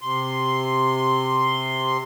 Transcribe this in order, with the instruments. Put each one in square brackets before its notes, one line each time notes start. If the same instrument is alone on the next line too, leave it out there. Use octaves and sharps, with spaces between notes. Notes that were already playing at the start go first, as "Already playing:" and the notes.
[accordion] C3 C6